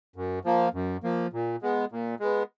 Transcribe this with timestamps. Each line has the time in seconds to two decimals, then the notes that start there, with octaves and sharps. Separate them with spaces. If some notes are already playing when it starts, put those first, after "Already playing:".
0.16 F#2
0.45 F3 A#3
0.74 F#2
1.03 F3 A#3
1.33 A#2
1.62 G#3 B3
1.92 A#2
2.20 G#3 B3